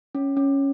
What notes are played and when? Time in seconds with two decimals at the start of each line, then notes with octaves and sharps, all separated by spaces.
0.15 C#4
0.37 C#4